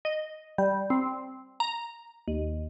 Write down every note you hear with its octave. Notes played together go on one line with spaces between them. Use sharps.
D#5
G3
C4
A#5
D#2